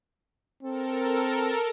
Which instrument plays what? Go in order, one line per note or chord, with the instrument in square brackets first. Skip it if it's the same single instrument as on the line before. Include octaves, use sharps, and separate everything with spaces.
[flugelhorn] C4 [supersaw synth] A4 A#4